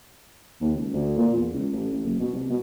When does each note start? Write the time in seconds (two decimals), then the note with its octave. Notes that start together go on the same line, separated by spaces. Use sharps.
0.61 D#2
0.76 C#2
0.93 D2
1.18 A#2
1.34 E2
1.53 C#2
1.72 A1
1.92 A1
2.05 F#1
2.20 B2
2.33 C2
2.50 B2